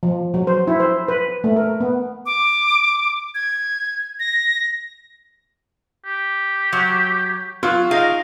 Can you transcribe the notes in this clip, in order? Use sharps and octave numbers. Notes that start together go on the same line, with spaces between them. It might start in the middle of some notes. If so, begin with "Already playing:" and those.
F3
F#3
C5
E4
C5
B4
A3
A#4
B3
D6
G#6
A#6
G4
F#3
F#3 F4
D#4 G#4 A#4 F5